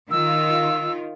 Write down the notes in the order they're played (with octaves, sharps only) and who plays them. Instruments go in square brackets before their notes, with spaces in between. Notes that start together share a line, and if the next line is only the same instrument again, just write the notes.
[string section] D#3 F4 [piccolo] E6